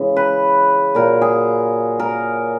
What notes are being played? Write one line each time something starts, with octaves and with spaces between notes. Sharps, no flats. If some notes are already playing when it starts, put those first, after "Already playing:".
Already playing: C#3 E3 G#3
B4
A#2 F#3 A#4
G#4
A#4